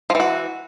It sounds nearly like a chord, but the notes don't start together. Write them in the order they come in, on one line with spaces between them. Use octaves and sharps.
F3 E3 F#4